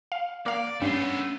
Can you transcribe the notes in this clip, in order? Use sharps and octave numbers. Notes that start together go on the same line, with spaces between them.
F5
A#3 D5 F5 D6
G2 A3 B3 C#4 D4 C7 G7